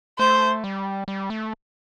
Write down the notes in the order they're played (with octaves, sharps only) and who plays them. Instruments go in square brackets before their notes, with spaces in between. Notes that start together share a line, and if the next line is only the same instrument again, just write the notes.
[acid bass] A3 [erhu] C5
[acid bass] G3
G3
A3